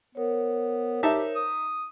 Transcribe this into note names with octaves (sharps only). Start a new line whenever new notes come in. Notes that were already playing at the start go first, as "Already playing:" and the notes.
B3 A#4 C5 C#5
D#4 G4 E5 A5
D#6